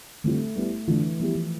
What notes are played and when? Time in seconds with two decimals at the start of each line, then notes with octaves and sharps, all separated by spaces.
0.24 D3 G3 A3 C4 F4
0.56 G3 B3 E4
0.88 D3 E3 A3 D4 F4
1.19 F3 G3 B3 E4 G4
1.35 E3